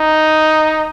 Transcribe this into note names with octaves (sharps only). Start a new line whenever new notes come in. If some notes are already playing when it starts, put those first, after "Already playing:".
Already playing: D#4